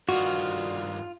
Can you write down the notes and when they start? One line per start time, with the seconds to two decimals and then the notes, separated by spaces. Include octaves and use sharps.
0.09 G2 D#3 F4 F#4